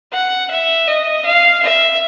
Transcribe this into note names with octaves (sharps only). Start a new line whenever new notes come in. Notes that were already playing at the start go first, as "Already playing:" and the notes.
F#5
E5
D#5
F5
E5